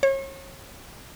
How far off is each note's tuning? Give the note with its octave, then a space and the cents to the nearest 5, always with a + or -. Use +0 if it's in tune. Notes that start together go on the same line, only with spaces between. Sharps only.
C#5 -35